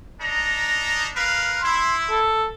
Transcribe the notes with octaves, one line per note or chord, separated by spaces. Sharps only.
D4 D#4 A#5
A#4 B4 F5
E4 C6
A4